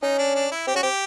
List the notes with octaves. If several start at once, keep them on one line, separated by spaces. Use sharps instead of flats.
C#4 D#4
D4
D4
E4
C4 G4
C#4 F#4
C4 G4